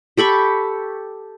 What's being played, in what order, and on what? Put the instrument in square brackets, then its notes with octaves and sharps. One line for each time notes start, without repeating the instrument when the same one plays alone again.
[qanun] G4 A4 B5 C#6